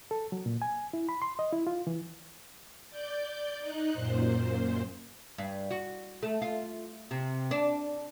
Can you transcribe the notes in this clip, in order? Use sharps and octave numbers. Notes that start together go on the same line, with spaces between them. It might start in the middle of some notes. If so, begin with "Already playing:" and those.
A4
F#3
A#2
G#5
E4
B5
C6
D#5
E4
F4
E3
D5 G6
D#4 F#6
F#2 A#2 C5
G2
F#4
A3
F4
C3
D4